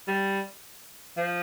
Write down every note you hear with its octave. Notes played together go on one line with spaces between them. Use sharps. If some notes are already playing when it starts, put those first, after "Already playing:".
G3
F3